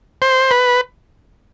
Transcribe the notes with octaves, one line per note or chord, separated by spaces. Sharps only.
C5
B4